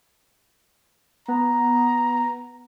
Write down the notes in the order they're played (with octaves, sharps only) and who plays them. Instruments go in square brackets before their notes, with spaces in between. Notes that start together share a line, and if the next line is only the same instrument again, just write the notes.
[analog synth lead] B3 [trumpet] A#5